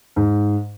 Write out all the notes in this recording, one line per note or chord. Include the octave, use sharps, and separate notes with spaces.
G#2